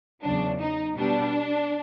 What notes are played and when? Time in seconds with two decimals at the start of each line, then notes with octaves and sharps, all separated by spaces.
0.23 E2 C#3 F#3 D4
0.61 D#4
0.97 B2 G3 B3 D4